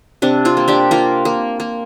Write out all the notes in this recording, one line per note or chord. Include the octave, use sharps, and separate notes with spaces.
C3 D4
C4 F4
A#3
D4 G4
A#3 F4 A#4
A#3
A#3